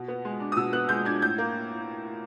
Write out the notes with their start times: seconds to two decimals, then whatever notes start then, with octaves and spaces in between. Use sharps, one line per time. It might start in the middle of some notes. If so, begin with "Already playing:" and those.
Already playing: B2
0.08 B3
0.25 G#3
0.40 D4
0.52 D#6
0.56 B2 E6
0.73 B3 F#6
0.89 G#3 G6
1.05 D4 G#6
1.22 A2 G6
1.38 A#3